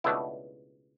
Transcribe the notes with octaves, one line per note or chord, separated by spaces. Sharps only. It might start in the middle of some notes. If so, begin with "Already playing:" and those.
C#2 B2 A3 D4 E4